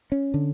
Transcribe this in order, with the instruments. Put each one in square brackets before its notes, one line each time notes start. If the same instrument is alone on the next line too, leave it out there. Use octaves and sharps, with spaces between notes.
[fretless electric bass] C#4
D3